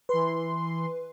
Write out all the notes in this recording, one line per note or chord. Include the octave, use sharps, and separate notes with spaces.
E3 B4 C6